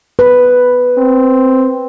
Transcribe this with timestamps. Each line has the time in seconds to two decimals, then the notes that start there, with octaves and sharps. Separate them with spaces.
0.19 B4
0.98 C4